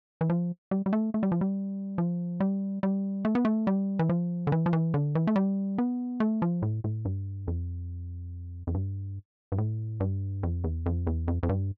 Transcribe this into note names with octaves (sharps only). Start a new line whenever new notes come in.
E3
F3
G3
G3
A3
A3
G3
F3
G3
F3
G3
G3
A3
B3
A3
G3
E3
F3
D3
E3
F3
E3
D3
E3
A3
G3
B3
A3
F3
A2
A2
G2
F2
F2
G2
G2
A2
G2
F2
E2
F2
E2
F2
F2
G2